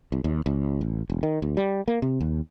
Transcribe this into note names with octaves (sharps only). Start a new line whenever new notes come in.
C2
D#2
C#2
A1
E1
D#3
D2
G3
A#3
C3
D#2